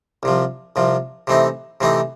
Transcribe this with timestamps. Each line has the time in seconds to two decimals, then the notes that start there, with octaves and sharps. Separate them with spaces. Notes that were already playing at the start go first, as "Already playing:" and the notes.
0.23 C2 C3 F3
0.76 C2 C3 F3
1.27 C3 E3 A3 C4 D#4
1.81 C3 E3 A3 C4 D#4